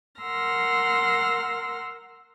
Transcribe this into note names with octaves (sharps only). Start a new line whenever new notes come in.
A#4 F#5 C6 E6 F6 A#6